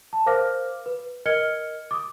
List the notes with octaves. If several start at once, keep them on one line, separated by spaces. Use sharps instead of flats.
A5
A#4 C5 F5 D6 F6 A#6
B4
A#4 D#5 F6 G#6 C#7 G7
D6 D#6